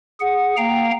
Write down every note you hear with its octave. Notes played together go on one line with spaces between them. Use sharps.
G#4 F#5
A#3 F5 G5 A#5